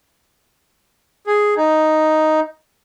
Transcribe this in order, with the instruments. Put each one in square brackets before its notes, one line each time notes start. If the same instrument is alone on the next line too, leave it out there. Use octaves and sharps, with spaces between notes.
[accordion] G#4
D#4